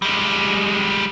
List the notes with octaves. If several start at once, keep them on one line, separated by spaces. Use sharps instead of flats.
G3 G#3